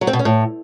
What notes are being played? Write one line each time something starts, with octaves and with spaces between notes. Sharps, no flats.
F#3
C4
B2
C#4
A2